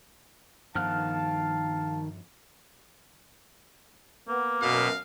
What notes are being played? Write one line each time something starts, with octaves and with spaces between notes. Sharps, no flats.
G2 D#3 F3 B3 F5 A5 F6 F#6
A#3 B3
F#2 B2 F5